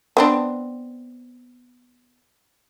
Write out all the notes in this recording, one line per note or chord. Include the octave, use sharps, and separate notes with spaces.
B3 C4 D4